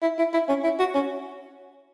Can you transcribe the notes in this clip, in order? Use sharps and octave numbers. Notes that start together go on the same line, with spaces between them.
E4
E4
E4
C#4
E4
F#4
C#4